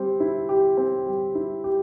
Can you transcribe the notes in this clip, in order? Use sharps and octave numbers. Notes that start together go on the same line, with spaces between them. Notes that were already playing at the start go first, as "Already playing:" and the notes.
Already playing: G3 C4
E4
G4
C4
G3
E4
G4